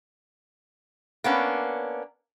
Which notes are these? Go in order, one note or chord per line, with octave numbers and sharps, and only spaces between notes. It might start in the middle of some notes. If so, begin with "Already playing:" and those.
A#3 B3 C#4 D4